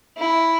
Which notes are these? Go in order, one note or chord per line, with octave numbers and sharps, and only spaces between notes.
E4